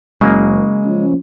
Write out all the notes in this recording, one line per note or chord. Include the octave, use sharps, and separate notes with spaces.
F#1 C#3 F#3 G#3 A#3
F3 C#4